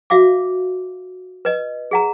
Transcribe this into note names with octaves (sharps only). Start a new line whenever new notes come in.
F#4 E5 F5 D6
B4 D#5
G#4 F#5 A#5